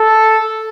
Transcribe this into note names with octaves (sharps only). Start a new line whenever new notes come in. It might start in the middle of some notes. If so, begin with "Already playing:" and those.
Already playing: A4